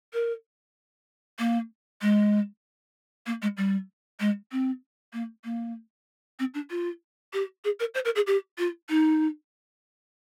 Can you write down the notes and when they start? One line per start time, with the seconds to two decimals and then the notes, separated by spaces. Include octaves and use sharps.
0.13 A#4
1.39 A#3
2.02 G#3
3.26 A#3
3.42 G#3
3.57 G3
4.20 G#3
4.52 C4
5.13 A#3
5.44 A#3
6.39 C4
6.54 D4
6.70 F4
7.33 G4
7.64 G#4
7.80 A#4
7.95 C5
8.05 A#4
8.15 G#4
8.27 G4
8.58 F4
8.89 D#4